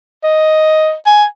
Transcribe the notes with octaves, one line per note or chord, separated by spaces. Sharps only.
D#5
G#5